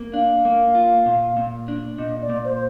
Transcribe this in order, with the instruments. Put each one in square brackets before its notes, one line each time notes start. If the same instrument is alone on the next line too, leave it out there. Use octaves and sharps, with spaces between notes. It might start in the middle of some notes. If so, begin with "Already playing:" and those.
Already playing: [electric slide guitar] A#3
[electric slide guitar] D4 [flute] F5
[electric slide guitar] A#3
F4
A#2
A#2
D4
[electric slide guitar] A#2 [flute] D#5
[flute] D5
[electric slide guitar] A#2
[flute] C5